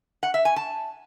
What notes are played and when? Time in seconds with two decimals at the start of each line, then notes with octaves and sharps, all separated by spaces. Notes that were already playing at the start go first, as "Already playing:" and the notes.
0.23 F#5
0.34 E5
0.45 G#5
0.56 A5